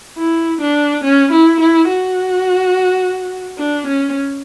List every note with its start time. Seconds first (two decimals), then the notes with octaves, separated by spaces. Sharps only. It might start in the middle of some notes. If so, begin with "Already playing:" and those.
0.18 E4
0.61 D4
1.04 C#4
1.32 E4
1.60 E4
1.88 F#4
3.58 D4
3.87 C#4